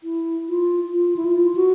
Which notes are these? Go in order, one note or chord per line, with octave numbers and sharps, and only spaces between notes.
E4
F4
F4
E4
F4
F#4